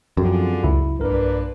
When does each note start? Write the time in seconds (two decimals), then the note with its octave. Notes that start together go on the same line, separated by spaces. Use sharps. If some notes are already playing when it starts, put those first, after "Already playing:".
0.17 F#2 D3 F3 C4 F4 G#4
0.64 C#2 E4
0.99 B1 G2 A#2 D4 A#4 B4